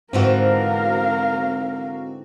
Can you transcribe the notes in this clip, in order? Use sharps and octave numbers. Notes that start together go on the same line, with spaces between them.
G#2 D3 E3 C4 F#4 A#4 F5